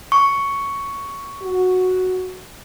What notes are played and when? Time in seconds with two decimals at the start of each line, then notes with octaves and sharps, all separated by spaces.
0.12 C#6
1.43 F#4